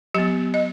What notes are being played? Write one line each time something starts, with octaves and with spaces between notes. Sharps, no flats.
F#3 B3 G4
D#5